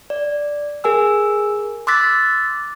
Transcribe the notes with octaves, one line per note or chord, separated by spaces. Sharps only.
D5
G#4 A#4 G#5 E6
C6 D6 E6 F#6 A6 B6